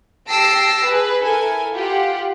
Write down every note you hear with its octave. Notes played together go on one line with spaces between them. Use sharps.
G4 A5 E6 A#6 C7 D7
G#4 B4
E4 A4 A#4 G#5
F4 G4 F#5